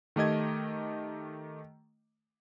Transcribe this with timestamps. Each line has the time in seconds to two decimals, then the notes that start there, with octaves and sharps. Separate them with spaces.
0.16 D#3 A3 G4 D#5 G#6